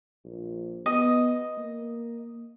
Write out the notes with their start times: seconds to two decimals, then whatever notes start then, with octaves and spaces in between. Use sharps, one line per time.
0.24 A#1
0.86 B3 D#5
1.58 A#3